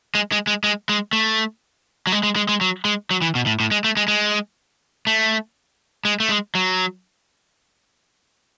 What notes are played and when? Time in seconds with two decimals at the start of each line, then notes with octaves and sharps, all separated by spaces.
0.15 G#3
0.32 G#3
0.47 G#3
0.64 G#3
0.89 G#3
1.13 A3
2.07 F#3
2.12 G#3
2.23 G#3
2.36 G#3
2.49 G#3
2.61 F#3
2.85 G#3
3.11 F#3
3.22 E3
3.35 B2
3.46 A2
3.60 A2
3.71 G#3
3.84 A3
3.97 G#3
4.08 G#3
5.07 A3
6.05 G#3
6.20 A3
6.30 G#3
6.55 F#3